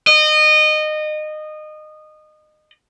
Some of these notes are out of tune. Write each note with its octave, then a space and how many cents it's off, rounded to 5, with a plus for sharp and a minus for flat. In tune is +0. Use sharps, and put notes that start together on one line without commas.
D#5 -25